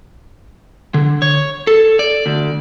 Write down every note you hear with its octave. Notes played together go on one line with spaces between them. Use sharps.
D3
C#5
A4
D5
D2